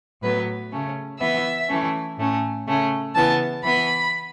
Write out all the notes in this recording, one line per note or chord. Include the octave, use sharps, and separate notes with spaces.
A2 F#3 B3 B4
C#3 A3 C#4
E3 B3 E5
E3 A3 C#4
A2 A3 C#4
C#3 A3 C#4
C#3 E3 B3 A5
E3 B3 B5